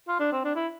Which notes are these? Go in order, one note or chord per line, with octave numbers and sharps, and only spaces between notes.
F4
D4
C4
D4
E4